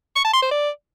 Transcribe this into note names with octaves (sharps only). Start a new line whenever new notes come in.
C#6
A5
C6
C5
D5